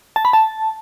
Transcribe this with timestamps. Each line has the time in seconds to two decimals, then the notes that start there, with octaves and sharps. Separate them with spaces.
0.16 A5
0.25 B5
0.33 A5